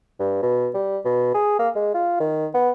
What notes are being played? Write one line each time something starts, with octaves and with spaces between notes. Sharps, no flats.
G2
B2
G3
B2
G#4
A#3
G#3
F4
D#3
B3